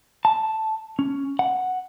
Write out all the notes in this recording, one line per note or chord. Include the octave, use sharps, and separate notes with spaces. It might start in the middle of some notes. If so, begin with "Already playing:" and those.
A5
C#4
F#5